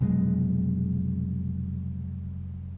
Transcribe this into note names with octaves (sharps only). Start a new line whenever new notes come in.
F1 B2 F#3 G#3